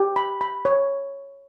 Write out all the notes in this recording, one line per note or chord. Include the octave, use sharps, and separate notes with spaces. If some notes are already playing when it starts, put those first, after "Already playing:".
Already playing: G4
B5
B5
C#5